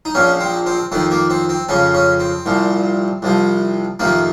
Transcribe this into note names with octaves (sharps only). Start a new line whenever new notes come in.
D#4
A#1 A#2 F3 C#4
C4
C4
F2 D#3 C4
A#3
C4
C4
F2 C#3 F3 C#4
C#4
C4
C2 A#2 F3
C2 C3 F3
F2 C3 D#3 A#3